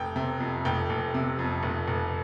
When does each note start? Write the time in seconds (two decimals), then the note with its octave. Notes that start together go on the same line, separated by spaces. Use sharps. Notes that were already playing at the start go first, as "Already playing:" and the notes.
Already playing: F1 G5
0.16 C3
0.40 F2
0.65 F1 G5
0.90 F1
1.14 C3
1.39 F2
1.63 F1
1.88 F1